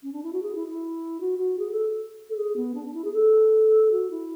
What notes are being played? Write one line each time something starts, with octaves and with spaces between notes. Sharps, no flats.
C#4
D4
E4
F#4
G#4
E4
E4
F#4
F#4
G#4
A4
A4
G#4
B3
D4
D4
E4
G#4
A4
F#4
E4